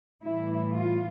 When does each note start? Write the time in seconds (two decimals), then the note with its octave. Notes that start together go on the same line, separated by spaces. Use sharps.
0.22 A2 E3 G3 E4
0.73 F4